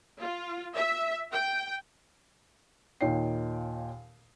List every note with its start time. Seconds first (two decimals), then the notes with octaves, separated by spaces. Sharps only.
0.21 F4
0.74 E5
1.32 G5
3.01 D#2 A#2 D#4 C#5 G5 C7